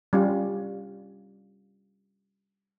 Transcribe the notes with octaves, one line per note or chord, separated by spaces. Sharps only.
G3 C#4 F4